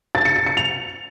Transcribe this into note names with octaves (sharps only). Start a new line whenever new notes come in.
A6
C#7
C#7
C#7
F7